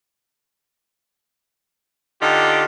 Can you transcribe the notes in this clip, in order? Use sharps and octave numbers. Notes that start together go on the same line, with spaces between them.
D3 D#4 F4 G4